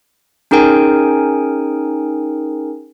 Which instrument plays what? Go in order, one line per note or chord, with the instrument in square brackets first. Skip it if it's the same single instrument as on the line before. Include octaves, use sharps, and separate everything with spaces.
[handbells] C#4 D#4 G#4 A#4 G5 G#5